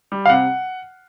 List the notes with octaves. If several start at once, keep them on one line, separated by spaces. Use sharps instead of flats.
G3
F5
C3 F#5